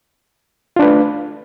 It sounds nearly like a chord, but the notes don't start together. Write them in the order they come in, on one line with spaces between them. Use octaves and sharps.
F4 D4 B4 A3